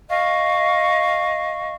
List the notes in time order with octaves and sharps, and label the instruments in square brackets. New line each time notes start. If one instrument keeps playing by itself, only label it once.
[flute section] D#5 F5 C#6